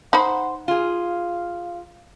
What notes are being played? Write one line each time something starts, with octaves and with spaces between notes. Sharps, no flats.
D#4 C5 F#5 B5
F4 G#4 F5